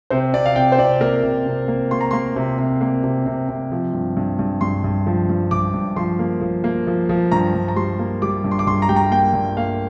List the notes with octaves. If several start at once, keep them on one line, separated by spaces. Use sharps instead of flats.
C3 C5
C3 D5
F5
C3 G5
C5
C3 D5
A#3 A#4
C3
C3
A#3
A#3 C6
A#5
A#3 C6
C3
C3
A#3
C3
C3
C3
F3
G2
G2
G2
G2 C6
G2
F3
G2
G2 D6
G2
F3 C6
A#3
F3
A#3
F3
F3
G2 A#5
G2
A#5
G3 C6
A#3
G3 D6
G2
C6
D6
G2 C6
A#5
G3 G5
A#5
A#3 G5
G2
A#3 F5